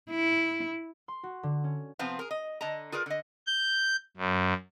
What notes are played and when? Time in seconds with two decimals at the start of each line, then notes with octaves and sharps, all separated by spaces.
0.11 E4
1.08 C6
1.23 F#4
1.43 D3
1.64 C#4
1.99 C3 F3 B3 C4 F4
2.19 G#4 A#4
2.31 D#5
2.61 D3 D#5 A5 A#5
2.92 F4 G#4 A#4 B4 D5
3.06 D3 D#5
3.47 G6
4.17 F#2